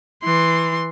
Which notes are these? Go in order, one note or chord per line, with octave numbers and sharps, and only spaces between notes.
E3 C6